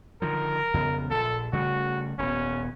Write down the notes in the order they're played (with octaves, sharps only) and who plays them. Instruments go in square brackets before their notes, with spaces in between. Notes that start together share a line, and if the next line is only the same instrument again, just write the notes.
[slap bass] D3 D#3 F3 [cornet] A#4
[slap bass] F2 C#3 B3
[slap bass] A#1 [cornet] A4
[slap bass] C#3 G3 A3 [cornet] F#4
[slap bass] D#1 B3 [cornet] C#4